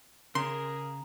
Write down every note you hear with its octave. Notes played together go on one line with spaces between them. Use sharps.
C#3 A#3 G#4 A#4 A#5 C6